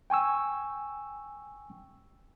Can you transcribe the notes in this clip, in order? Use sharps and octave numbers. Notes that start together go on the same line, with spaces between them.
G5 G#5 C#6 E6